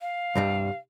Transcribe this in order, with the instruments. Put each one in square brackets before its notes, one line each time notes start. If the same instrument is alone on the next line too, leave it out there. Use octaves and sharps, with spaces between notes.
[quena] F5
[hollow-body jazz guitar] C2 G2 G3